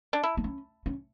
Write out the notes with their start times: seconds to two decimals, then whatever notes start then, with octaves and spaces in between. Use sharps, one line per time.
0.13 D4
0.23 E4
0.37 B3
0.44 C#4
0.86 C#4